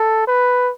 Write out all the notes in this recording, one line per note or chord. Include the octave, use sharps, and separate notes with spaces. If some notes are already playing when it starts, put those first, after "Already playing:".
Already playing: A4
B4